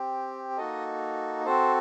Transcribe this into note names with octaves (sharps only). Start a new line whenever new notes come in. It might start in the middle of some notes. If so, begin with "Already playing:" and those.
Already playing: C4 G4
A#3 D#4 F#4 A4 D#5
C4 F#4 A4 C5